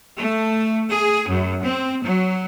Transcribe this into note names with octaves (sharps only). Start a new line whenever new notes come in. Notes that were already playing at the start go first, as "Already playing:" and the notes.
A3
G#4
F#2
C4
F#3